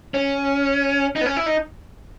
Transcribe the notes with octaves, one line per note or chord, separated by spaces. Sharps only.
C#4
D#4
B3
C#4
E4
D#4